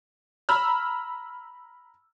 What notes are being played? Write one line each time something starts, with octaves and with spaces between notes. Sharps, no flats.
A#5 B5 E6 F6